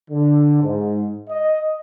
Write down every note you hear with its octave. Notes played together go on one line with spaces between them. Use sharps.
D3
G#2
D#5